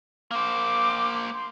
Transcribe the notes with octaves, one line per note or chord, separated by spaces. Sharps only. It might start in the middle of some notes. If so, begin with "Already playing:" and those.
A#3 C5 D6
C6